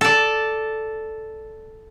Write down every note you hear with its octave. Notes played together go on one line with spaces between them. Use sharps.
A4 D5